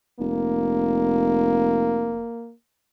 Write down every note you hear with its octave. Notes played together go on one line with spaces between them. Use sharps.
F1 A#3